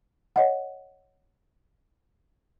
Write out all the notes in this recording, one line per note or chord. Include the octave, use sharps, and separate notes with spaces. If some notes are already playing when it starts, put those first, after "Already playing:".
C#5 D#5 F#5